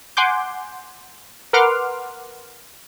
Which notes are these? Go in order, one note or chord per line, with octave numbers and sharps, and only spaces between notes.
F#5 G#5 C6 D6 G6
A#4 B4 F#5 C6 D6 F6